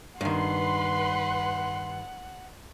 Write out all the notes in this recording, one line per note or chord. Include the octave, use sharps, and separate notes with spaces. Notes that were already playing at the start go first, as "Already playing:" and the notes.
G2 D#3 B4 F#5 C6